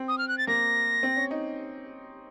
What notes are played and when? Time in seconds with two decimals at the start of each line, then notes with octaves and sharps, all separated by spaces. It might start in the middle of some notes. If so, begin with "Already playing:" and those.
Already playing: C4
0.08 D#6
0.18 F6
0.28 F#6
0.38 A6
0.47 A#3 A#6
1.03 C4
1.17 C#4
1.31 D#4